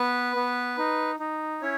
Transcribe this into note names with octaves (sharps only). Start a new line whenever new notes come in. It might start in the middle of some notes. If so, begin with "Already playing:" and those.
Already playing: B3 B4
B3
D#4
D#4
C#4 E4 C#5